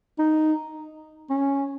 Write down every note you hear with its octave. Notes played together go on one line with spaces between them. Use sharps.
D#4
C#4